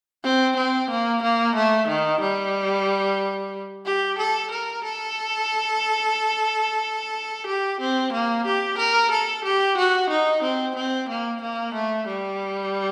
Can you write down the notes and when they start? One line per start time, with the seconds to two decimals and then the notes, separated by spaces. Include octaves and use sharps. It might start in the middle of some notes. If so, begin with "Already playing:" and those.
0.24 C4
0.57 C4
0.90 A#3
1.22 A#3
1.55 A3
1.88 D#3
2.21 G3
3.86 G4
4.18 A4
4.51 A#4
4.84 A4
7.47 G4
7.80 C4
8.13 A#3
8.46 G4
8.78 A#4
9.11 A4
9.44 G4
9.77 F#4
10.10 D#4
10.43 C4
10.76 C4
11.09 A#3
11.41 A#3
11.74 A3
12.07 G3